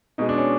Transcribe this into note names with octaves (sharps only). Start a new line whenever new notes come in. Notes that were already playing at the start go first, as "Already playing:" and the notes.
B2 G#3 D#4
D4
C#4